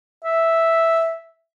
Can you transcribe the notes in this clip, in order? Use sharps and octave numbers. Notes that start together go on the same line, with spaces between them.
E5